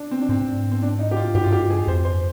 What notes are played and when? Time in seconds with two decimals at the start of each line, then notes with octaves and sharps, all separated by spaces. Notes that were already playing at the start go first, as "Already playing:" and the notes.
Already playing: D4
0.11 C4
0.21 D4
0.29 G#2 C4
0.72 C4
0.82 D4
0.99 D#4
1.11 G4
1.17 F4
1.35 G2 G4
1.44 F4
1.52 G4
1.70 G#4
1.87 F2 C5
2.05 C5